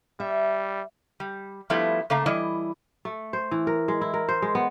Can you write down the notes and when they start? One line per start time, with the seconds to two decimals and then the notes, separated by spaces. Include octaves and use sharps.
0.20 G3 E5
1.20 G3
1.70 F3 G3 A3 B3 E4 F4
2.10 C#3 A3 A#3 F5 A#5
2.26 E3 G3 E4 D#5
3.05 A3
3.33 C5
3.51 E3
3.67 A#4
3.88 G#3
4.01 E4
4.14 A#4
4.29 C5
4.42 G#3
4.55 B3